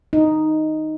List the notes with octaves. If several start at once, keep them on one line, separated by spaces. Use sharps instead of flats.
D#4